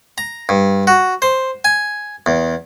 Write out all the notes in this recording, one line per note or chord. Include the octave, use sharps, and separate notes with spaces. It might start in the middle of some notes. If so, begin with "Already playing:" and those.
A#5
G2
F#4
C5
G#5
E2